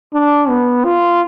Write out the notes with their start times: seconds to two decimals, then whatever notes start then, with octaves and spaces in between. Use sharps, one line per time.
0.14 D4
0.49 B3
0.85 F4